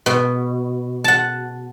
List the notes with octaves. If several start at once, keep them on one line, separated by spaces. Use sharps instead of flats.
B2
F#5 A5